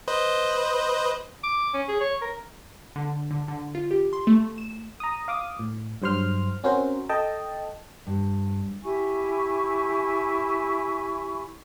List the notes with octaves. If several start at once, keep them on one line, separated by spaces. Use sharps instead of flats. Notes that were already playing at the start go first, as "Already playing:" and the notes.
B4 C5 D#5
D6
C#4
G#4
C#5
A#4
D3
D3
D3
F4
G4
C6
A3
E7
A#5 D#6
F5 D6 D#6
A2
G2 F#3 C5 C6 F6
C4 C#4 F#4 A#4 C5
A4 D#5 G5 A5
G2
E4 G4 G#5 C#6